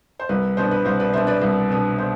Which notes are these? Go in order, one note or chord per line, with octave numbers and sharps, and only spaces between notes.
C5
C2 B4
B2 B3 D4 C5
B4
C2 C5
B4 D5
B2 B3 D4 C5 E5
B4 D5
C2 B4
B2 B3 D4
C5